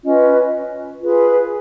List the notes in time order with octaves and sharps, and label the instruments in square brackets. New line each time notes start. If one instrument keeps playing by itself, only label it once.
[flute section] C#4 F4 B4 D#5
F4 G#4 B4